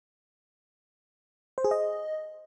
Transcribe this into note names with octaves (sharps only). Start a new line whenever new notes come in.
C5
G#4
D#5